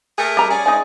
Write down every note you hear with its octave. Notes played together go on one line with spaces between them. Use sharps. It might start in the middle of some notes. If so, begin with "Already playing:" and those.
A3 G#4 A#4
G3 A#5
C#4 G#4 D5
G#3 D#4 G#5